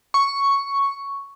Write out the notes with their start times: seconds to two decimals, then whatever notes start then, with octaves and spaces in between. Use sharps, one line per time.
0.14 C#6